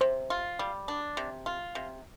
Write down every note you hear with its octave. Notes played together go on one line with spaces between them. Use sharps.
C3 C5
F4
G3
D4
C3
F4
C3